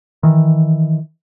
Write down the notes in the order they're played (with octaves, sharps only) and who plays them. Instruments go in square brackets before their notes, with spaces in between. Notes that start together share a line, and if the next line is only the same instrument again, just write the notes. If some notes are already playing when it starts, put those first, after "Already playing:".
[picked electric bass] D#3 E3